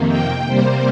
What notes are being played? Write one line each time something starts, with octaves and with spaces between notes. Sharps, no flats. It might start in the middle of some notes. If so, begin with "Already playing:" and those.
Already playing: F2 C3 D#3 A#3
G5
C3 G3 A#3 C5